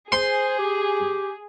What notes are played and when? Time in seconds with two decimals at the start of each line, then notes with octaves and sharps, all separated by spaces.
0.12 G#4 C5 C6
0.59 G4